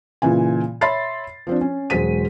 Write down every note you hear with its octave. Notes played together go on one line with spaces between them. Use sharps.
A#2 C#3 E3 G#5
C#5 E5 B5 C6 A6 C7
F3 C4 D4
C#4
E1 F#3 G#3 C5 B6 D#7